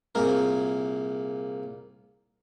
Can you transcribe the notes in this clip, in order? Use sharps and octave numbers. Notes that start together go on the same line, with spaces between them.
C2 A#2 G#4 A#4